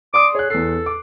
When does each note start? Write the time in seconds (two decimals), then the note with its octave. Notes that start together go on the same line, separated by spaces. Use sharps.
0.14 D5 C6 D6 D#6
0.35 G#4 C#5 F#6
0.50 E2 A4 C7
0.86 D6